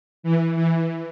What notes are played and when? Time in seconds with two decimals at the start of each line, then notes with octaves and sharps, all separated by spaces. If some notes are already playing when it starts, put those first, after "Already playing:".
0.23 E3
0.56 E3